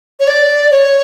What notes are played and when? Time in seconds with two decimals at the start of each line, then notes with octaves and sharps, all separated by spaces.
0.20 C#5
0.28 D5
0.71 C#5